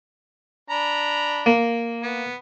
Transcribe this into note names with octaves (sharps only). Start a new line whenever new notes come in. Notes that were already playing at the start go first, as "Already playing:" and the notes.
D4 A#5 B5
A#3
B3